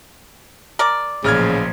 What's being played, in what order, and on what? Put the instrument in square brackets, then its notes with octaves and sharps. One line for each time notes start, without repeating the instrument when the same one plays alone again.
[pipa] A#4 D5
[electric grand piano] A1 F6 G#6 [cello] A#2 F3 [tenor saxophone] C#3